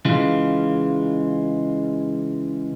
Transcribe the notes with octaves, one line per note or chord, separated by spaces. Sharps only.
C#3 E3 G#3 F4